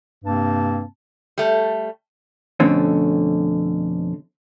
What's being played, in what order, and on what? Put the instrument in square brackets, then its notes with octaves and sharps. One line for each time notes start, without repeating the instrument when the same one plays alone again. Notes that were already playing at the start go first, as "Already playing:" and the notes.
[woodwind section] G2 C3 A#3 C4 A5
[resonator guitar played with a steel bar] G3 A3
[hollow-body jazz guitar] F2 B2 D3 A3 C4 C#4